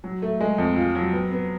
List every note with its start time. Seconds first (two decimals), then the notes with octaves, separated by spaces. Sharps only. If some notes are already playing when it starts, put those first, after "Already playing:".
0.04 F#3
0.22 A3
0.41 G#3
0.58 F2
0.76 F4
0.95 F#3
1.13 B3
1.32 B3